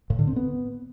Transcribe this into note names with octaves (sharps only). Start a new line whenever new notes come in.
A2
D3
C4
B3